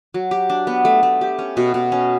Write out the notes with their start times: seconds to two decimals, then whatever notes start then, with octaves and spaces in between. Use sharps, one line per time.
0.14 F#3
0.31 G4
0.50 D4
0.67 B3
0.85 A3
1.03 A3
1.21 G4
1.39 C#4
1.57 B2
1.74 B2
1.92 C#4